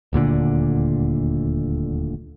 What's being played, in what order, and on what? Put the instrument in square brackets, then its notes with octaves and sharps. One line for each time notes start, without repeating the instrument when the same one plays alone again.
[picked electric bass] D#1 D2 A#2 D3